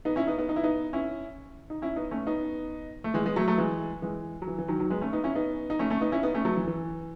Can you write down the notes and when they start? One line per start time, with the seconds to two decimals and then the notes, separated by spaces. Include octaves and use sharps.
0.05 B3 D#4
0.16 C#4 E4
0.27 B3 D#4
0.38 B3 D#4
0.49 D#4
0.56 E4
0.63 B3 D#4
0.93 C#4 E4
1.70 D#4
1.82 C#4 E4
1.96 B3 D#4
2.11 A3 C#4
2.26 B3 D#4
3.04 A3
3.14 E3 G#3
3.25 G#3 B3
3.36 F#3 A3
3.47 F#3 A3
3.58 E3 G#3
4.02 E3 G#3
4.42 F#3
4.47 E3
4.58 E3
4.68 D#3 F#3
4.80 D#3 F#3
4.90 G#3 B3
5.01 A3 C#4
5.13 B3 D#4
5.24 C#4 E4
5.35 B3 D#4
5.70 D#4
5.79 A3 C#4
5.90 A3 C#4
6.01 B3 D#4
6.12 C#4 E4
6.23 B3 D#4
6.35 A3 C#4
6.45 F#3 A3
6.57 E3
6.67 E3